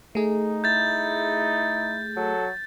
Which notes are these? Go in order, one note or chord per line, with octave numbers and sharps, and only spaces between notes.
A3 D#4 G#4
E4 G6 A6
F#3 A4